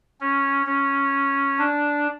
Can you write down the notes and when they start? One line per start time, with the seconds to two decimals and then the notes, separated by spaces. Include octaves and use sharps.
0.21 C#4
0.66 C#4
1.59 D4